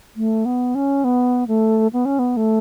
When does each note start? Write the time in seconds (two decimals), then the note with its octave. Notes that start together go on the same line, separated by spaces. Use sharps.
0.16 A3
0.45 B3
0.75 C#4
1.04 B3
1.48 A3
1.93 B3
2.05 C#4
2.19 B3
2.37 A3